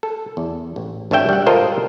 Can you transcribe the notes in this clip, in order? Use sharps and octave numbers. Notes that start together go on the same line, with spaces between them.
A4
E2
A1
G#1 D4 C#5 E5 G5
G3 F#5
F4 A4 A#4 C5 D#5